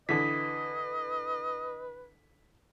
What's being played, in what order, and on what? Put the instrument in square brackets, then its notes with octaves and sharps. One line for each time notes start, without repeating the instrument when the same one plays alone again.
[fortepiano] D3 E3 [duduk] B4 [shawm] D#5 [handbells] B6